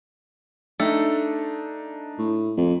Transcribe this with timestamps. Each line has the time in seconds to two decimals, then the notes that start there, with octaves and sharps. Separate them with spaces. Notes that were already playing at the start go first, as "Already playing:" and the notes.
0.80 A3 D4 D#4
2.18 A2
2.57 F2